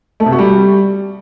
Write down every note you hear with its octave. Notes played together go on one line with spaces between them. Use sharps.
A3
C3
F#4
G3